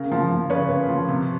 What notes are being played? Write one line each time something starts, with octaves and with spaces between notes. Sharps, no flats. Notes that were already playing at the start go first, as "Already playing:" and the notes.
Already playing: C#3 A#4
F3
F3
C#3 B4 C#5
C#3
F3
C3